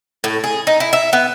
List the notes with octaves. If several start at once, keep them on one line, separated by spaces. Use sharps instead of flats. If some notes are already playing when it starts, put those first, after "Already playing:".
A2
G#4
D#4
E4
E5
B3